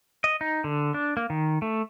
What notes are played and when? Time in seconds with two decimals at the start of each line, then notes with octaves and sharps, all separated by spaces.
0.24 D#5
0.41 D#4
0.64 D3
0.94 D4
1.17 A#3
1.30 D#3
1.62 A3